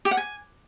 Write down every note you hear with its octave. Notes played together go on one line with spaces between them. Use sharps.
G4
F#5
G#5